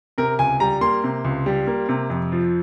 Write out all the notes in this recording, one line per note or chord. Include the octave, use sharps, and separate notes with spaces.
C3 A#4
C#2 G#5
G3 A#5
A#3 C6
C3
C#2
G3
A#3
C3
F2
F3